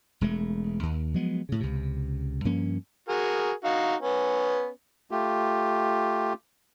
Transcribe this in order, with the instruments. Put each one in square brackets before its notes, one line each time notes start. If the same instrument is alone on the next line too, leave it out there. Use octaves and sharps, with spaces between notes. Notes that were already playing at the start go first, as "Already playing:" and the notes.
[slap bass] E1 G#3 A3
D#2
F3 F#3 G#3 B3
A2 C#3
C#2 C3
G2 F3 A#3 C#4
[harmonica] F#4 G#4 A#4
D#4 F#4 F5
B3 C#4
[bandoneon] A3 F4 G4